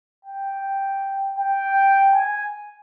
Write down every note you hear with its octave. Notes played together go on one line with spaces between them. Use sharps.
G5
G5
G#5